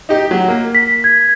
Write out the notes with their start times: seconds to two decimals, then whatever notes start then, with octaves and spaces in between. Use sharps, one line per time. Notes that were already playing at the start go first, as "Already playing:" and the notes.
0.09 D#4 G4
0.31 F#3
0.48 A#3
0.75 B6
1.04 G#6